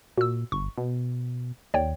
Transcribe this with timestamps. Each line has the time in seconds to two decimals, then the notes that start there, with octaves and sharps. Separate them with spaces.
0.18 A#2 F#4 E6
0.52 G1 C#6
0.78 B2
1.74 D#2 C#5 D5 G5